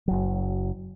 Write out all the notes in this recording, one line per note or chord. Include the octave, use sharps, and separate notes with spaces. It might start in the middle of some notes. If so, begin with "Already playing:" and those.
F#1 F#3